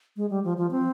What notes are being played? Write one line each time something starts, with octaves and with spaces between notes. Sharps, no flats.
G#3
G3
F3
F3
C4